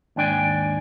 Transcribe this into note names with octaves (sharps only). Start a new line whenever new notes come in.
D#2 G#2 D4 G5 G#5